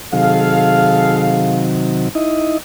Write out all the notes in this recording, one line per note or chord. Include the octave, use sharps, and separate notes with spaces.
C3 D#3 F#3 G#4 A4 F5
D#4 E4 D#5